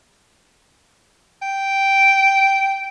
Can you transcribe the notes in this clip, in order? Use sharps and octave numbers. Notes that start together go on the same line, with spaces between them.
G5